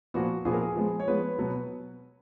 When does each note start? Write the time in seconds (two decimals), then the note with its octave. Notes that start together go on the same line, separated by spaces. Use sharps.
0.14 A#2 F3 B3 F#4
0.45 A#2 F3 B3 G#4
0.53 A#4
0.62 G#4
0.76 F3 G#3 B3
1.00 C#5
1.08 F3 G#3 B3 B4
1.39 B2 F#3 B3